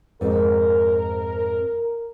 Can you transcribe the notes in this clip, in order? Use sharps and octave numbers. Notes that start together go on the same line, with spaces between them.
F2 G#2 A#4